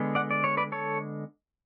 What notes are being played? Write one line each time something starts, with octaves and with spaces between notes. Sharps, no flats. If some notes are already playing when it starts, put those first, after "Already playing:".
Already playing: D3 G#3 B3
D5 F#5
D5
C#5
B4 D5
A4 C#5